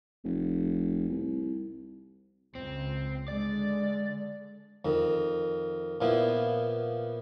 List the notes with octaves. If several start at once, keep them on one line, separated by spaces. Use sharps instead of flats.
F1
C2
C#2 C4
D3 G#3 D5
F2 D#3
A#2 F3 B3 E4